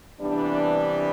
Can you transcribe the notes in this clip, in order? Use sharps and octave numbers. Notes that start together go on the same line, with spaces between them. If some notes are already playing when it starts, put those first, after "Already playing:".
C3 E3 G3 B3 D4